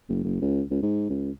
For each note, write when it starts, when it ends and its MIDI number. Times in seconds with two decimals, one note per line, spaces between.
0.09 0.23 30
0.24 0.38 30
0.41 0.63 37
0.71 0.81 37
0.83 1.08 44
1.09 1.31 37